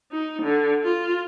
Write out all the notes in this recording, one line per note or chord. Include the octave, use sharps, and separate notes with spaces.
D#4
D3
F4